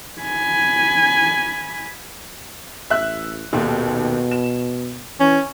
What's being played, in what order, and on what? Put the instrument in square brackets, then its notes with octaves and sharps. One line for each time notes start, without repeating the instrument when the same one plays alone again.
[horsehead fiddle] G#5 B5
[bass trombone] A1 [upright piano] E5 F#6
[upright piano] D#1 D#2 [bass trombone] B2
[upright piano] E7
[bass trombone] E3 [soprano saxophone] C#4